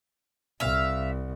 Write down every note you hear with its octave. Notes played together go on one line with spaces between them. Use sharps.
C2 E5 F5